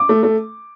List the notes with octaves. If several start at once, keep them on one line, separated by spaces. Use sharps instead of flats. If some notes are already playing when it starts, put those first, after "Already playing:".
Already playing: D6
A3
A3